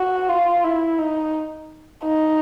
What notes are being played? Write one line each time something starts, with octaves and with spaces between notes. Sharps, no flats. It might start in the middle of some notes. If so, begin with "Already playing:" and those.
Already playing: F#4
F4
E4
D#4
D#4